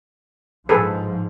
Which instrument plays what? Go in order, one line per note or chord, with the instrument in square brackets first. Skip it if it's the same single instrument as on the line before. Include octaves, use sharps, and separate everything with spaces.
[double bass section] G#2 F3 [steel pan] G#4 A4 B4